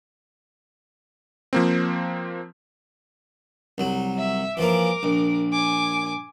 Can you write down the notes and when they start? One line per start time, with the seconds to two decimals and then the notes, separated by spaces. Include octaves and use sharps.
1.53 F3 A#3 C4
3.78 C2 F#3
4.18 E5
4.57 E3 F3 A#3 A#4 D6
5.03 A#1
5.52 G#5 D6